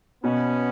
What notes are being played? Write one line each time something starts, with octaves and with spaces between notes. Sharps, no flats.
B2 B3 C#4